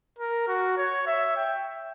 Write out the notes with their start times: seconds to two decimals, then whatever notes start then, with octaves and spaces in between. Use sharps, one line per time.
0.19 A#4
0.47 F#4
0.77 C#5
1.07 E5
1.37 G5